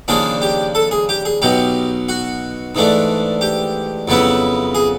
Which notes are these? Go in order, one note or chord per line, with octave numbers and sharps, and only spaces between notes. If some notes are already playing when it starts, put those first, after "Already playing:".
D#2 C#3 F3 A#3 D4 G#4
G4
A4
G#4
G4
G#4
B1 B2 F#3 G4
F#4
G#2 E3 A3 D4
G4
F2 C#3 F#3 B3 E4
G#4